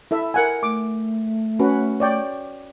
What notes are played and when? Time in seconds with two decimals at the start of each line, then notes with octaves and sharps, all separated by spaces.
0.11 E4 A4 E5
0.34 A#4 F#5 G#5
0.63 A3 D6
1.59 C#4 F#4 B4
2.00 C#5 D5 G5